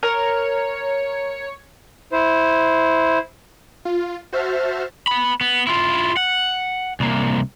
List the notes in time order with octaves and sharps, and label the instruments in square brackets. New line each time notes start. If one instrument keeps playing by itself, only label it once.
[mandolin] A#4 [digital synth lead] C#5
[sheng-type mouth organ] E4 C5
[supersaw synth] F4
F#4 C5 E5 A5 F6
[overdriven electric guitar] B3 B5
B3
E4 F4
F#5
C2 A#3